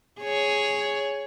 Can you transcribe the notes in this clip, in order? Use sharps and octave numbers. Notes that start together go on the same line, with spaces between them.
G#4 C#5